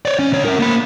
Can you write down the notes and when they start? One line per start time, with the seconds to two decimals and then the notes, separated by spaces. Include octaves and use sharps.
0.05 C#5 D5
0.19 C#4
0.32 C#2 C#5
0.45 C#4 A#4
0.60 A#3 B5